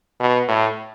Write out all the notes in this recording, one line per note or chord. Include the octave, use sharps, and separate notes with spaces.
B2
A2